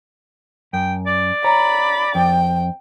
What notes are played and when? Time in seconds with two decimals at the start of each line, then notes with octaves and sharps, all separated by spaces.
0.73 F#2 G5
1.07 D5
1.44 C#5 A#5 B5
2.15 F2 G5